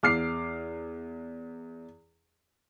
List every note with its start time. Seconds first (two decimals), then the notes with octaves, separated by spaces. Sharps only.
0.03 E2 D6 F6 C7